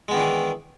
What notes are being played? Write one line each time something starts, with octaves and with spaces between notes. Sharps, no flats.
D#3 E3 G#3 B3 D4